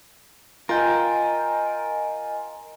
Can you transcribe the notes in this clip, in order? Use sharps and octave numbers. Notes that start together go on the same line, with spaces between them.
F4 A#4 D#5 G5 G#5